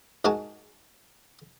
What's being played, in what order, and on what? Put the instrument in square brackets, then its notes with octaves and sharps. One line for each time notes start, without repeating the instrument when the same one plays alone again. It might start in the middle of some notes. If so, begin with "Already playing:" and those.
[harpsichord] G#2 F#4 A#4 G#5 A5